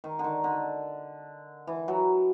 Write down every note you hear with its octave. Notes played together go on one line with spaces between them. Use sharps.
D#3
D3
D#3
D3
E3
F#3